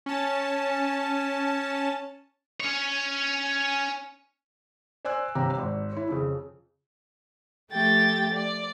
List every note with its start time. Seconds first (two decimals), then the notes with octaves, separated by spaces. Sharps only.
0.06 C#4 A5
2.60 C#4 C#5
5.05 C5 D5 G#5 E6 F#6
5.35 G1 C3 G4 A#5 E6
5.59 G#1
5.93 E4 C#5
6.09 F2 C#3
7.71 F3 A3 G4 G5 A6
8.34 D5